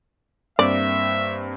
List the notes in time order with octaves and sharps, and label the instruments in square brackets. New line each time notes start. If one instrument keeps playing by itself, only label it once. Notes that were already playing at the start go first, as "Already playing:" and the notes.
[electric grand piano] G2 A#3 C4 [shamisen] D5 [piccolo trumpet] E5